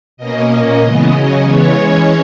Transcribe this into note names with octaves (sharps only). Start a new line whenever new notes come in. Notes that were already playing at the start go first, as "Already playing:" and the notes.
B2 A#3 C#4 D#5
A#2 A#3 C#4 D#5
C#3 E3 G#3 B3
C#3 F#3 C#4
C#3 E3 G#3 B3 C#5
E3 G#3 C#4